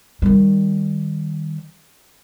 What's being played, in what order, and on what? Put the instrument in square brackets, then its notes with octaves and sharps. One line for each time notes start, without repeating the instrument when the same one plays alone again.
[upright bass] D#3 G3